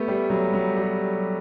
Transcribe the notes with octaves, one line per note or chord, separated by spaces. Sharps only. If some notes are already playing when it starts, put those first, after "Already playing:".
Already playing: A3 B3 G4
G3
F#3
F#3
G3